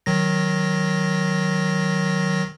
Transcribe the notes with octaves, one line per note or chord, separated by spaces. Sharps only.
D#3 F#3 A#6